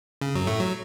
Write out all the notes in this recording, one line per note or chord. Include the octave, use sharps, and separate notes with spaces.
C#3
F#2 F#3
A2 A3
F#3